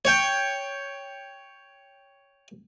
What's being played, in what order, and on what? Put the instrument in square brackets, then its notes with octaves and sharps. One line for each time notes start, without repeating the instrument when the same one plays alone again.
[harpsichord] C#5 G5